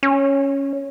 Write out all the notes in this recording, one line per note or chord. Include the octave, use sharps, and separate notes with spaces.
C#4